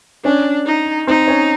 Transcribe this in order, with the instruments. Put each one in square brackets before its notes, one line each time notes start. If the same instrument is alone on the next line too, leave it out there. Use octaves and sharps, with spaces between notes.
[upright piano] C#4 C#5 [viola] D4
[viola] D#4
[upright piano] C4 C5 [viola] D#4
[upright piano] C#4 C#5